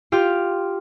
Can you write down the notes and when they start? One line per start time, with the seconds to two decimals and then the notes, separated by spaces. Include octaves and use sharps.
0.12 F4 G4 F6 D7